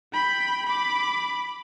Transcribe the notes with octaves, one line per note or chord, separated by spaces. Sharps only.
G5 B5
B5 D6